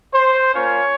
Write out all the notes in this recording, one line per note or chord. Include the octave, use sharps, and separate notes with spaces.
C5
A#3 C#4 F4 C#5